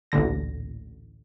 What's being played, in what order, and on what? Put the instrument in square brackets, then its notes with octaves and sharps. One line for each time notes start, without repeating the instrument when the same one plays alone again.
[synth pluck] A1 D2 A#2 D3 A#6